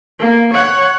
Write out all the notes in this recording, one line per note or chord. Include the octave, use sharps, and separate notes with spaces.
A#3
C#5 F#5